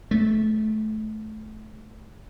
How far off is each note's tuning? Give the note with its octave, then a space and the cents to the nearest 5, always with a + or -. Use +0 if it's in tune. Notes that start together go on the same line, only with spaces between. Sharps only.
A3 -25